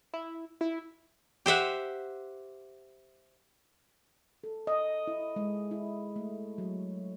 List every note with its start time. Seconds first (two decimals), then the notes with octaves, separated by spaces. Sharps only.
0.14 E4
0.61 E4
1.46 G4 C5 E5 F#5
4.44 A4
4.67 D#5
5.07 E4
5.36 G#3
5.71 E4
6.16 A3
6.58 F#3